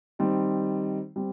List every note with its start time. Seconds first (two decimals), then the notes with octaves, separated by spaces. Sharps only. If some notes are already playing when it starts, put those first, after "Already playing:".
0.19 D#3 G3 C4 D#4
1.16 G3 C4